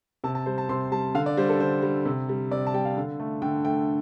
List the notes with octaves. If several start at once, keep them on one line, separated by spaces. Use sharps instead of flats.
C3 A5
A5
G3 C5
A5
C3 C6
G3 A5
D3 F5
D5
G3 C5
A4
D3 C5
G3
C3
G3
C3 D5
A5
G3 G5
F5
D3
A3
D3 G5
A3 G5